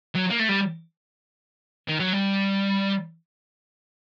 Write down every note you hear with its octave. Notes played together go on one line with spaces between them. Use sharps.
F#3
A#3
A3
G3
D#3
F#3
G3